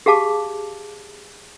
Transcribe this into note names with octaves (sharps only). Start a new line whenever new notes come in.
G4 G#4 F5 A5 D6